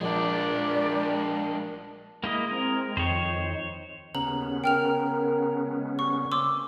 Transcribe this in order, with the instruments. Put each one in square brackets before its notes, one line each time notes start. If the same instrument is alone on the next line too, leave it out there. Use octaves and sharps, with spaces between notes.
[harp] A#1 [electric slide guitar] G#3 D4 [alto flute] A#4 [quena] D5
[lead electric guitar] G#3 [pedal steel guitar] A#3 E4 D#5
[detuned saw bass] C4 [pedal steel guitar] A#4
[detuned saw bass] F2 [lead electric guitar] D#3 [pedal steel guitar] C5 C#5
[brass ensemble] D#2 [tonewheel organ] C#3 B3 C#4 [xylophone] A#5 F#7
[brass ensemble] A#4 [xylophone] G5 F6 F7
[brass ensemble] G#3
[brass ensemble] G3 A#3 [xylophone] C#6
[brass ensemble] A#3 C4 C#4 [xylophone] C6 D6 E6